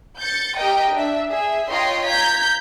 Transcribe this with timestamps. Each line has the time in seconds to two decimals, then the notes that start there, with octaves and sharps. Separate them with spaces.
0.19 G6 A6 C#7
0.58 G4 A#4 D#5 G5
0.93 D4 E5
1.31 G#4 E5
1.71 F4 C#5 D#5 G5 A#5 C6
2.08 A#5 G6 G#6 B6